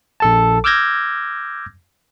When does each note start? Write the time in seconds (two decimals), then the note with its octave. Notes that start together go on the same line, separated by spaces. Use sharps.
0.20 A#1 A4 A5
0.64 D6 E6 F6 G6 G#6 A#6